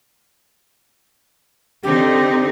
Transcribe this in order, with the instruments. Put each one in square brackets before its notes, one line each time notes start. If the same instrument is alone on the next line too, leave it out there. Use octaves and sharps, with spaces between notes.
[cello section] D3 C4 D#4 [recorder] G4